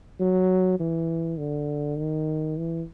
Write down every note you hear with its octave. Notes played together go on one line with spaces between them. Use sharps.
F#3
E3
D3
D#3
E3